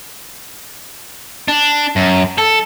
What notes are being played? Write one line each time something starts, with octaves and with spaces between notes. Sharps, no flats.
D4
F#2
A4